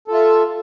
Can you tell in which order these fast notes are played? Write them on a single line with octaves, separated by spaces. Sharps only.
A4 F4 E5